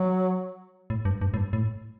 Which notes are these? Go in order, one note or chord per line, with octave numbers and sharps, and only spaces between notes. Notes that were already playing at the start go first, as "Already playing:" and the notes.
Already playing: F#3
A2
G2
G2
A2
G2
A2